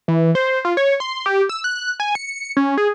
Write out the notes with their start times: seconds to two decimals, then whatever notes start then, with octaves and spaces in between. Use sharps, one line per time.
0.08 E3
0.35 C5
0.65 F4
0.77 C#5
1.00 C6
1.26 G4
1.49 E6
1.64 F#6
2.00 G#5
2.15 C#7
2.57 C#4
2.77 G#4